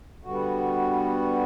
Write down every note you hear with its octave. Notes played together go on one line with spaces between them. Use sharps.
D3 G3 B3 F#4